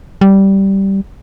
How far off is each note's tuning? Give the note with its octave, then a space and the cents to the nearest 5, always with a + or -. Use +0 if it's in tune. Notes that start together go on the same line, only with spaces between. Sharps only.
G3 -10